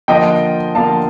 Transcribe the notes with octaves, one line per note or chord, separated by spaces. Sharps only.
D3 F3 A#3 F4 D#5 G5
D3 F3 A#3 F4 F5 A5